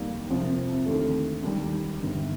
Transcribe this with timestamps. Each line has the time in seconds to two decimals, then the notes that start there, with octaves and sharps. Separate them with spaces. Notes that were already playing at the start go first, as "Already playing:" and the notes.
Already playing: F2 D#3 G3 A#3
0.30 C2 C3 F3 C4
0.86 D#2 D3 A3
1.43 D#2 D#3 G3
2.00 G1 G2 D#3